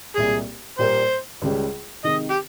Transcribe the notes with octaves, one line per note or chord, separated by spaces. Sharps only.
C2 A#2 G#3 G#4
A#2 G3 A#3 C5
C#2 C#3 G3
C3 D#3 G#3 D#4 D#5
G4